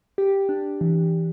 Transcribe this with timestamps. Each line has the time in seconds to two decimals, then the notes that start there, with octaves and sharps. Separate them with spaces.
0.18 G4
0.49 D4
0.81 E3